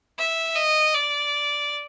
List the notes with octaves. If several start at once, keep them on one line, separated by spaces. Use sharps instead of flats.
E5
D#5
D5